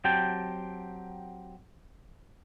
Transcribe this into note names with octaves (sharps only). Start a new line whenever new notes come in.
F#3 C4 G4 G5 A5